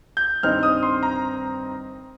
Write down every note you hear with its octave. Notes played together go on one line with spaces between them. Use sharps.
G6
G2 D#3 C4 D#4 F6
D#6
C6
A#5